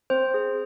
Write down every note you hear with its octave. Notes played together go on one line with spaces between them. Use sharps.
C4 C5
G#4